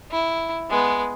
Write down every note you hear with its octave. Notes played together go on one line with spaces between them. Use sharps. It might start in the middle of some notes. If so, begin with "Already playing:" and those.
E4
G#3 B3